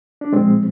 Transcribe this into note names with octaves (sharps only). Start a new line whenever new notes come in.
D4
A#2 F3 G#3 C4